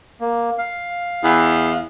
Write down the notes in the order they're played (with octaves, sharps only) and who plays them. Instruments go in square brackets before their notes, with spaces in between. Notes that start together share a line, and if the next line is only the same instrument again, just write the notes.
[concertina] A#3
F5
[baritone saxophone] E2